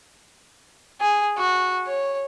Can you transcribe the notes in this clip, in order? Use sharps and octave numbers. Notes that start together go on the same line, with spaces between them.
G#4
F#4
C#5